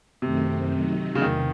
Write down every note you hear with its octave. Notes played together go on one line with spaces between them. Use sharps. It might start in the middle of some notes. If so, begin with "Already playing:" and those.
F#2 C3 D#3 A3 C4
D#3 F#3 A3 D#4
C#3
E2 C3 D#3